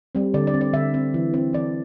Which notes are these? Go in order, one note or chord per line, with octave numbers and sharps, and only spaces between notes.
G3 C4
D3 D5
D5
C4
D5
D3 E5
C4
E3
C4
E3 D5